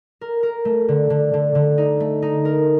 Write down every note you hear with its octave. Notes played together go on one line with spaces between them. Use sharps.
A#4
A#4
A3
D3
D3
D3
D3
D#4
A3
D#4
A#4